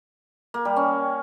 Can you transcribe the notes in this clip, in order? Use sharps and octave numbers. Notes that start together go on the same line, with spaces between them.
A#3
G3
C#4